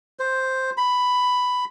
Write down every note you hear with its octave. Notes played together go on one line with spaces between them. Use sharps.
C5
B5